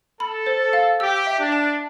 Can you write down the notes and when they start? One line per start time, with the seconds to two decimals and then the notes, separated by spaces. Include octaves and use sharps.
0.20 A4 B5
0.46 C5
0.73 F5
0.99 G4 E6
1.27 E5
1.39 D4
1.52 A5